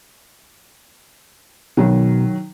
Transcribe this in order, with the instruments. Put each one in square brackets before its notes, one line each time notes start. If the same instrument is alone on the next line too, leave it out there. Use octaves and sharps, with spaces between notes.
[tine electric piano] B2 [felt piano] D#3 F#3